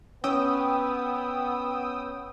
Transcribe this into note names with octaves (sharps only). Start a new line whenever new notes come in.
B3 C#4 G5 D#6 E6